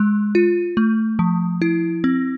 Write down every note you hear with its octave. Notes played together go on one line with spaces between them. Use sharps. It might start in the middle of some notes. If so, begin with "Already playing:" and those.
Already playing: G#3
F4
A3
F3
E4
C4